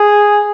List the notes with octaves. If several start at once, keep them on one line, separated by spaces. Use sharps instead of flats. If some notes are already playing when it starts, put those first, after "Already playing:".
Already playing: G#4